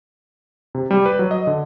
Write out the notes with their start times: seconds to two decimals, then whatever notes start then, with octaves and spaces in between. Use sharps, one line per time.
0.75 C3
0.91 G3
1.06 B4
1.19 F#3
1.31 D#5
1.47 D3